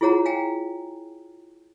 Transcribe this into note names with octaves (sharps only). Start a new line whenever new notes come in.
E4 F4 G#4 C#5 F#5 A#5
F5 G5 G#5 A#5